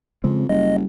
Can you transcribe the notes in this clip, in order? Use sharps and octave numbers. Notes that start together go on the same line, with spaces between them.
F2 C#3 G#3 C4
F#1 G3 D#5